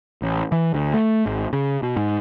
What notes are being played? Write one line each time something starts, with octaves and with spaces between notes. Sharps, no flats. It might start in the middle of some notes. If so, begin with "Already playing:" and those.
A1
E3
D2
A3
G#1
C#3
B2
G#2